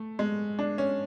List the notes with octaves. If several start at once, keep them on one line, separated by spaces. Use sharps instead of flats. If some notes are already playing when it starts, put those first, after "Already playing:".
Already playing: A3
G#3
D4
C#4